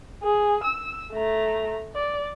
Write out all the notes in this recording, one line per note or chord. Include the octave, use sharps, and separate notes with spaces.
G#4
E6
A3 A#5
D5